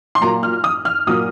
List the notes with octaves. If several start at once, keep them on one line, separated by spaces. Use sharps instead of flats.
C6
A#2 F#3 A#3 A#5
F6
D#6
F6
A#2 F#3 A#3 D#6